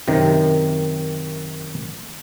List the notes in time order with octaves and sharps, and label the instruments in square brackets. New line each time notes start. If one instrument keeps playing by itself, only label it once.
[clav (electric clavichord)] F#2 C3 D#3